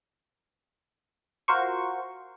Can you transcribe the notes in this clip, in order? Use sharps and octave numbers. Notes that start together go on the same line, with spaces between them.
F4 F#4 A#4 C5 C#6